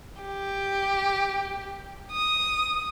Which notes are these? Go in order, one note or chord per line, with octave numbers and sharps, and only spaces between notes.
G4
D#6